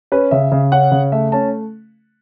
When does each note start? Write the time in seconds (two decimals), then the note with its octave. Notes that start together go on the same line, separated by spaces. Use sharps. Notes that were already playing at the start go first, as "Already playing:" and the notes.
0.12 C#4 B4
0.31 C#3 E5
0.52 C#3
0.72 C#4 F#5
0.92 C#3
1.12 A3 E5
1.32 C#4 A5